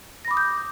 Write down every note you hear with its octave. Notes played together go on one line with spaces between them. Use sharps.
B5 D6 D#6 G6 A#6